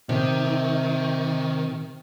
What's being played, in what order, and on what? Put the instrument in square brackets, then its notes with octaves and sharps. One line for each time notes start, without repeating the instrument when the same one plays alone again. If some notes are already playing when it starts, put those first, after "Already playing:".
[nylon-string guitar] C3 [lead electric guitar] D#3